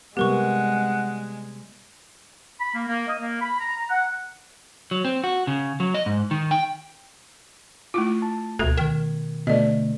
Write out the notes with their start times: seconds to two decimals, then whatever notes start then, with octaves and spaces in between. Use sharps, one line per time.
0.17 C3 G3 G#3 B3 G4 A#4 F#5 C#6
2.61 B5
2.75 A#3
2.88 A#3
3.08 D#5
3.20 A#3
3.41 B5
3.60 A#5
3.76 A#5
3.90 F#5
4.91 F#3
5.05 C4
5.24 F#4
5.47 C#3
5.80 F#3
5.94 D#5
6.06 G#2
6.31 D#3
6.51 G5
7.94 A3 E4 F4
8.22 A5
8.59 D2 B2 A4 G#6
8.77 D#3
9.47 B2 D3 A3 D5 D#5